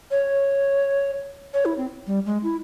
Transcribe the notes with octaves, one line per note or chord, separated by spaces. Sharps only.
C#5
C#5
E4
C4
G3
G#3
E4